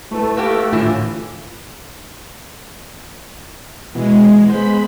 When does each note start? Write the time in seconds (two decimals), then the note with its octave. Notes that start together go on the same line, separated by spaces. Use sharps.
0.11 A3 E4 B4 A5
0.37 A#3 B3 G4
0.73 A2 D3 E3 F4
3.95 B2 E3 G#3
4.49 G#3 B3 C5 B5